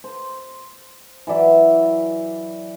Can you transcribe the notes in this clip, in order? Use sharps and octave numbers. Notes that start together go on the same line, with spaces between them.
C5
E3 F#3 D5 E5